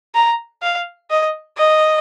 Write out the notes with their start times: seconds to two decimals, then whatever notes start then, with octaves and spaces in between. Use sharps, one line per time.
0.15 A#5
0.63 F5
1.10 D#5
1.58 D#5